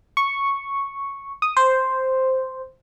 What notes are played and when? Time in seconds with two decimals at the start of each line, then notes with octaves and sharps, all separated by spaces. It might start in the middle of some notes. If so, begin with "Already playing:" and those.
0.17 C#6
1.42 D#6
1.57 C5